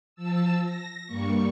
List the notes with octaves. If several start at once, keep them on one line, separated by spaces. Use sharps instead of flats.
F3 A5 E6
A#6
G2 G3 A#3 C#6